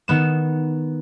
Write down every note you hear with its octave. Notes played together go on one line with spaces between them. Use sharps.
D#3 B3 E7